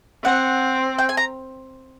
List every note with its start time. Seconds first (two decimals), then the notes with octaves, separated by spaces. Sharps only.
0.24 C4 F#5
0.98 G5
1.09 G#5
1.17 A#5